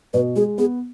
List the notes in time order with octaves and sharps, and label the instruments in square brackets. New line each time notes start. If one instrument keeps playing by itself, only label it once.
[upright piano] B2 [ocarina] B4
[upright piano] G#3 [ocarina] G#4
[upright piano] B3 [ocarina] G#4